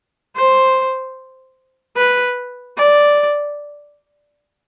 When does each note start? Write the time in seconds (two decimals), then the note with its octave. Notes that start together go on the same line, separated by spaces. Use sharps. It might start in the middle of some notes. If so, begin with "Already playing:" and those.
0.37 C5
1.97 B4
2.77 D5